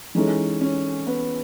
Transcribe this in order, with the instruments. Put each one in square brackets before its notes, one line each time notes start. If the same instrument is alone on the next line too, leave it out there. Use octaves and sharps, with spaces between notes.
[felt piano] E3 G#3 D#4 A4 [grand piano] C#4
[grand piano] C#4
B3